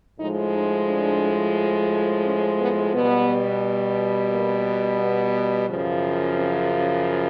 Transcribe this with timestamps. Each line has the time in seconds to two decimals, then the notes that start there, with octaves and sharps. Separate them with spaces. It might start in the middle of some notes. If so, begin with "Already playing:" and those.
0.20 A2 F3 G#3 D#4
0.54 D#4
0.88 D4
2.25 C#4
2.59 B3
2.94 B2 G3 B3
4.31 A#3
5.00 B3
5.68 F#2 C#3 F3
6.36 C4
6.70 C#4